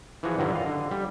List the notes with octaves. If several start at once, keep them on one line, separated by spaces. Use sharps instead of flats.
E3 F3 F#4 G#4
G2 D3 D#3 F#3 G3
F4 D#5 F5
D3
G3